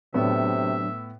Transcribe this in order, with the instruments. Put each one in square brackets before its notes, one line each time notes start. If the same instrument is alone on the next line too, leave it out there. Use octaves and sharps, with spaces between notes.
[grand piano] A2 B3 [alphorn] C3 [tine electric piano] F#3 D4 [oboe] E5